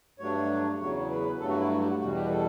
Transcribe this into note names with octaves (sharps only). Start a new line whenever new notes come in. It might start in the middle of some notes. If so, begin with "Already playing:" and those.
G2 F#3 A3 D4 C#5
E2 C#3 F#3 C#5
B4
G2 F#3 A3 A4
F#4
E4
F#4
G4
F#4
E2 B2 G3 F#4
G4
B4
A4